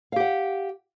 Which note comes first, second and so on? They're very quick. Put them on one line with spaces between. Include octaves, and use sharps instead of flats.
F5 G4 F#5